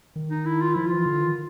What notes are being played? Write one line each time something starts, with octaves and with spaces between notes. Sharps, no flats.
D#3
D#4
E4
F4
F3 E4
F4
E3
D3
D#3